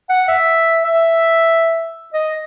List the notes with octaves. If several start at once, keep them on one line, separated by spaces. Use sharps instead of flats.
F#5
E5
E5
D#5